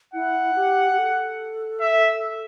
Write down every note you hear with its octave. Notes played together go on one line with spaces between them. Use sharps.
E4 F#5
G4
G4
A4
E5